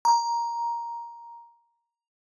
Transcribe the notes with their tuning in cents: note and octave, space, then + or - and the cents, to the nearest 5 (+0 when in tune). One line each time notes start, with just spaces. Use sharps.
A#5 +10